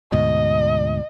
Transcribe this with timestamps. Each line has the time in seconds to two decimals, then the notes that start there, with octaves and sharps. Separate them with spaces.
0.12 D2 G#2 B2 D#5